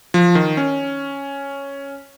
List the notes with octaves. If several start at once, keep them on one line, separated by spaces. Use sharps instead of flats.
F3
D#3
C#4